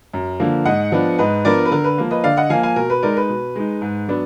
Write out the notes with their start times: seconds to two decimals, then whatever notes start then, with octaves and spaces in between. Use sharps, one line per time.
0.14 F#2
0.40 D3 F3 A#3
0.65 G#2 D#5 F#5
0.92 F3 B3 D4
1.18 G#2 B4 D#5
1.45 F3 B3 D4 A#4 D5
1.65 B4
1.71 D3 A#4
1.84 B4
1.98 F3 A#3
2.11 B4 D#5
2.24 D3 D5 F5
2.37 D#5 F#5
2.50 F3 A#3 F5 G#5
2.63 F5 G#5
2.76 B2 A#4
2.90 B4
3.03 G#3 D#4 A#4 D5
3.17 B4
3.29 B2
3.56 G#3 D#4
3.82 G#2
4.09 F#3 B3 D4